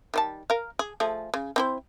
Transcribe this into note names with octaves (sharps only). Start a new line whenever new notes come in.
D#3 G3 A5
A#4 F5
G#4
F3 A3 G#4
C#3
C4 E4 C5